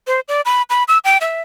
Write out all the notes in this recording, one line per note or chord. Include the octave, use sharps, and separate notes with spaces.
C5
D5
B5
B5
E6
G5
E5